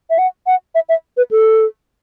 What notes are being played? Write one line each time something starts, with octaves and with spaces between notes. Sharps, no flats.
E5
F#5
F#5
E5
E5
B4
A4